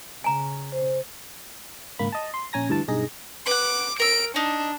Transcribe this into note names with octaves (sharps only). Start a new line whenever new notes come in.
C#3 G#5 A#5
C5
G#1 C#2 A#3 B5
D#5 A5
C6
A#1 C#4 G#5 A#5 A#6
D2 G2 E3 A5
B1 G2 D#4 G#4 A#6
B4 F#5 D6
A#4 E6 D7
D4 D#4